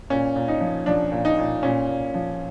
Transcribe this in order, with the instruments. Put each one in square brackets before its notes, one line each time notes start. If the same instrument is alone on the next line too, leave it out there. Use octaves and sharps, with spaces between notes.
[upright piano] A#2 C#4
A#2
D#4
F3
F3 D4
A#2
D#4
A#2
A#2 C#4
A#2
F3